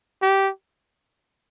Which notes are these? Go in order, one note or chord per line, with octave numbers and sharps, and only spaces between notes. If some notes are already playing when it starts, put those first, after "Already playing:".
G4